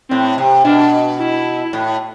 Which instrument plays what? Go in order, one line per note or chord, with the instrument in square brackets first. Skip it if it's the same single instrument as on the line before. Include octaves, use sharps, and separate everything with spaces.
[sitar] A2 [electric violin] C4
[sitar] C3
[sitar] B2 [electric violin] D4
[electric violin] E4
[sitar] A2